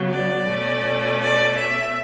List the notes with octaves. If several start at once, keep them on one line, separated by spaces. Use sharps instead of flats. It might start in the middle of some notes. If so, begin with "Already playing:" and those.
Already playing: C#3 F#3 B3
D5
B2 A3 C#4
D5
E5